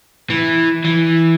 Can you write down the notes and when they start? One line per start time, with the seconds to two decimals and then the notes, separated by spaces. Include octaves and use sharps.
0.30 E3
0.84 E3